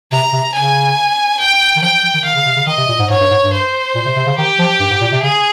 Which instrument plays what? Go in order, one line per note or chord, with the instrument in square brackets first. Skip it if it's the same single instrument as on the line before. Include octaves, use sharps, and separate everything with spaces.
[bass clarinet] C3 [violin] A#5
[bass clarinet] C3
[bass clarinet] C#3 [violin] G#5
[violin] G5
[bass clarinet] D#3
[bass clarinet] F3 [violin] G5
[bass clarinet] F3
D#3
[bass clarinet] D#3 [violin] F5
[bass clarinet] C#3
C3
C#3
[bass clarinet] D#3 [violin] D#5
[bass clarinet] C3
A#2
G#2
[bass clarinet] G#2 [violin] C#5
[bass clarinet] G2
G#2
G2
[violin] C5
[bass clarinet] A#2
C3
C3
C#3
[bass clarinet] D#3 [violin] G4
[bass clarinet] F3
G2
G#2
A#2
C3
[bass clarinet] C#3 [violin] G#4